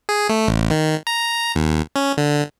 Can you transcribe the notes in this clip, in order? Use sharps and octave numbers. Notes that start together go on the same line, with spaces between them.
G#4
A3
A1
D#3
A#5
D#2
C#4
D3